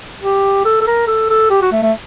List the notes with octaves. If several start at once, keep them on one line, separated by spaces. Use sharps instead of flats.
G4
A4
A4
A#4
A4
A4
G4
F#4
A3
A3